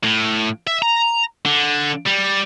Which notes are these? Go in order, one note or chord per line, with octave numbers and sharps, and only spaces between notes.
A2
E5
A#5
D3
G3